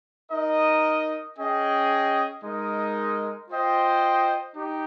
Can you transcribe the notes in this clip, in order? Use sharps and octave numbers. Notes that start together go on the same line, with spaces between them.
D#4 A#4 D#5
C#4 G#4 D#5 G5
G#3 D#4 A#4 D#5
F4 C5 D#5 G5
D#4 G4